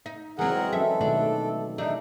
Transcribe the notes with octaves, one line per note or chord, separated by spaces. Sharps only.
D#4
E2 E3 F#3 G#3 C4 G#4 A#4 F#5
F#3 C#4 A4 E5
B2 D#3 A3 D4
E3 G3 D4 D#4